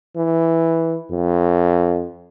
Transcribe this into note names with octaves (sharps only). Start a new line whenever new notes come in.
E3
F2